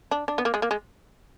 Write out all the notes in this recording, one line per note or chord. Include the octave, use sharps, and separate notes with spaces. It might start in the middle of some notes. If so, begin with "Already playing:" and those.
D4
D4
B3
A#3
G#3
A#3
G#3